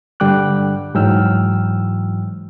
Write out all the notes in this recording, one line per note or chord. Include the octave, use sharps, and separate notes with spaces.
G2 D3 G3 G5 D6 F#6
G#2 E3 F#3 G5 E6 F6